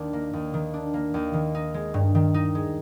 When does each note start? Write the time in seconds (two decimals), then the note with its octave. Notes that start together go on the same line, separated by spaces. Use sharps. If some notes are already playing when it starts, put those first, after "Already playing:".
Already playing: D#2 D#3 D4
0.13 A#3
0.33 D#2
0.54 D#3
0.73 D4
0.94 A#3
1.14 D#2
1.34 D#3
1.55 D#4
1.74 G#3
1.94 G2
2.15 D#3
2.34 D#4
2.55 G#3